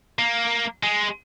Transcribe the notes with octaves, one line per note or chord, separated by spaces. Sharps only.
A#3
G#3